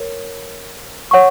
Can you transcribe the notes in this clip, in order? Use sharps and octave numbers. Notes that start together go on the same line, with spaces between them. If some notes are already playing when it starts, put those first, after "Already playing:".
Already playing: A#4 C#5
C#5 F#5 C#6